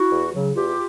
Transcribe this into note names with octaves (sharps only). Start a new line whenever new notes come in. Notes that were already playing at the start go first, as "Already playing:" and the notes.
Already playing: E4 F#4
E2
C#3 F#3
E2 F4 G4